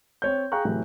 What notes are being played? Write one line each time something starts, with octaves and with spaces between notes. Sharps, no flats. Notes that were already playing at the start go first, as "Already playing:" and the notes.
C4 C#5 G6
G#4 F5 G5 A#5 C#6 F#6
A2 C3 E3 F#3